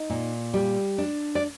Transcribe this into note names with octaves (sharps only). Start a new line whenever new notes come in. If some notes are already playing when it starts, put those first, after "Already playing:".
Already playing: D#4
A#2
G3
D4
D5